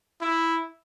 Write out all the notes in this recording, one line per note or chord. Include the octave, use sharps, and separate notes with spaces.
E4